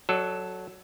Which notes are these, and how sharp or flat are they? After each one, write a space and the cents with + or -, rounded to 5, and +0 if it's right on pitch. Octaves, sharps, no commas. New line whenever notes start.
F#3 +0 A4 +0 D5 +40